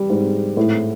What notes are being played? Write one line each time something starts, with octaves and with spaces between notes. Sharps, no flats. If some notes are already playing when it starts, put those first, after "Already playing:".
Already playing: G3
G#2
A2